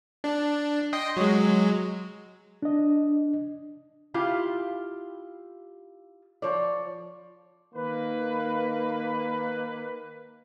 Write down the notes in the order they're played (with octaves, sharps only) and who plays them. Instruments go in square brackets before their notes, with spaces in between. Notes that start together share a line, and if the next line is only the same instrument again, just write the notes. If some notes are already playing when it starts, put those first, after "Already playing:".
[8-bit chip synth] D4
D#5 G5 C6
F#3 G#3
[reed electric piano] D4 D#5
[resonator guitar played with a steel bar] E4 F4 G4 F5
F3 C#5 D5
[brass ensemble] D#3 A#3 B4